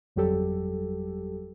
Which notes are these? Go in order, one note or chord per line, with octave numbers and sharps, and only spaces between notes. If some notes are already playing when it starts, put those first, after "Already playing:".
G1 F2 F#3 G3 G4 A4